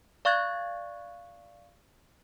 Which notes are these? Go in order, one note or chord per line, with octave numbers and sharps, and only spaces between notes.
D5 F5 C#6 F#6 G#6 A6